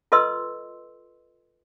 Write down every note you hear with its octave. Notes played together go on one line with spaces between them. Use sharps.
F4 A4 B4 D#5 C6 E6